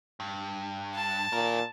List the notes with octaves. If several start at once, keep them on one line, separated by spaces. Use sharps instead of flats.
G2
A5
A#2 D#3 A#4